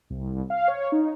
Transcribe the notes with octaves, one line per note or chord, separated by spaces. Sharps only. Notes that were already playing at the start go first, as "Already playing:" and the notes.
C2
F5
C#5
D#4